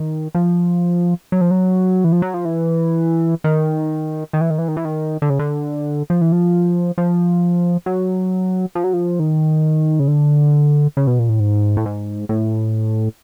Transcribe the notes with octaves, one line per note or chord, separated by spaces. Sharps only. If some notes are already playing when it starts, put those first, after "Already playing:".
Already playing: D#3
F3
F#3
F3
F#3
E3
F3
F#3
F3
E3
D#3
D#3
E3
D#3
E3
D#3
E3
D#3
D3
C#3
D3
F3
E3
F3
F3
F#3
F3
F#3
F3
D#3
C#3
D3
C#3
B2
A#2
A2
G#2
A2
G#2
A2